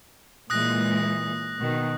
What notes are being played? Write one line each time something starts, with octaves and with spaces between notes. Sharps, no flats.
A#2 E3 G#3 D#6 F#6 A#6
B2 D#3